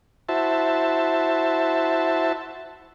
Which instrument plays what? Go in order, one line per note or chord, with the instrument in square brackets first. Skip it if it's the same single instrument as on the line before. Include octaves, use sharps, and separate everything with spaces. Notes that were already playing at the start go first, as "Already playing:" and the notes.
[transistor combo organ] E4 F#4 C5 E5 A5